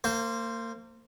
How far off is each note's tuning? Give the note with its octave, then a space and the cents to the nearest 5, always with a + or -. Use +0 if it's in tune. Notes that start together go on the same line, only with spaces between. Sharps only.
A#3 -35 C5 +0